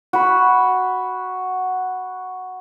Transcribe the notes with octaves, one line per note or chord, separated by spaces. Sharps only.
F#4 B5